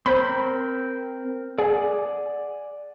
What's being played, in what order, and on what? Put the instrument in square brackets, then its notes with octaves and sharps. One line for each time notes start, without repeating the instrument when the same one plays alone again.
[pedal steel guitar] C4 A#4 G6 [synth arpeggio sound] C5 B5
[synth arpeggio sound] G#4 [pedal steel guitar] D5 F#5 G#5